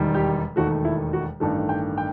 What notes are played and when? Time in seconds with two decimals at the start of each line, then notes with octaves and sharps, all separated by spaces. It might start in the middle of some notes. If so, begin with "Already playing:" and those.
Already playing: E1 D#2 D#3 G3
0.14 G4
0.56 E1 D#2 D#3 A3 F#4
0.85 E4
1.13 F#4
1.40 A1 G2 D#3 A3 A4
1.69 G5
1.98 G5